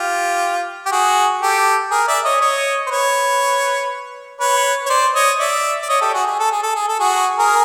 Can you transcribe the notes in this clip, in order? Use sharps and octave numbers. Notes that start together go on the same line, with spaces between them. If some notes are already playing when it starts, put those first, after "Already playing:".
Already playing: F4 G4
G4
F#4 G#4
G4 A4
G#4 A#4
D5 E5
C#5 D#5
C#5 D#5
C5
B4 C#5
B4 C#5
C#5
C5 D5
C#5 D#5
D5 E5
D5
C#5 D#5
G4 A4
F#4 G#4
G#4
A4
G#4
A4
G#4
A4
F#4 G#4
G#4 A#4